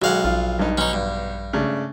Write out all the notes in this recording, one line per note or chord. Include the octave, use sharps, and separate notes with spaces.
B1 G#3 F#4 F5 F#5
A#1 F4
G2 D#4
B1 C#4 D#4
G2
C#3 A3 D4